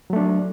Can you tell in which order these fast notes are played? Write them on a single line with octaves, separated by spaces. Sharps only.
F#3 A3 D4